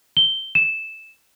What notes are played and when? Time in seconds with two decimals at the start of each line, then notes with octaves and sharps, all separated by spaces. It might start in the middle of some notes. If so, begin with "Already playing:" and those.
0.17 G7
0.55 E7